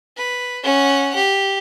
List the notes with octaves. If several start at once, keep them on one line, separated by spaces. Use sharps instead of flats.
B4
C#4 F#5
G4